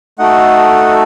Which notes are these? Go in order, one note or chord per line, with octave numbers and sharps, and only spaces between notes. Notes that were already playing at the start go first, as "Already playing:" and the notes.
A3 D#4 F#4 A4 D#5 F#5